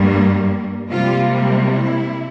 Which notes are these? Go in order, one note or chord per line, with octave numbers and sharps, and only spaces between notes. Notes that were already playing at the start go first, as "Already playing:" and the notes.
Already playing: G2 G3 A#3
C3 G3 A#3 F4
E4